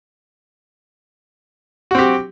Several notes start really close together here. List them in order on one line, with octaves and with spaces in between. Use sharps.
F#4 C4 G4